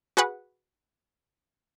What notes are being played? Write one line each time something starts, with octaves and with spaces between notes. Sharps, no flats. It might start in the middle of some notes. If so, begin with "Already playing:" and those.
F#4 G#4 B4 F#5